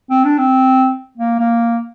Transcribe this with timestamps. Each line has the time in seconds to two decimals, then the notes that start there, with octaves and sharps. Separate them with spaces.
0.10 C4
0.25 D4
0.38 C4
1.17 A#3
1.39 A#3